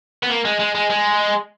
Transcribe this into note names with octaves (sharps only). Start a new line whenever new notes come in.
B3
A#3
G#3
G#3
G#3
G#3